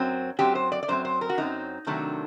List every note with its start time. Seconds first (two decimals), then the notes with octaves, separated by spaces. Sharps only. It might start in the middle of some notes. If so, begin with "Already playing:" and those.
Already playing: F#2 F#3 C4
0.39 F#2 F#3 C4 G4
0.55 C5
0.72 D5
0.83 D5
0.88 F#2 F#3 C4 C5
1.05 C5
1.21 A#4
1.29 F#4
1.38 F#2 F#3 C4 D#4
1.87 C3 D#3 F#3 A3 D4